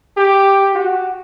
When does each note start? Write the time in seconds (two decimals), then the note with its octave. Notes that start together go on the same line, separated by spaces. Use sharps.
0.17 G4
0.75 F#4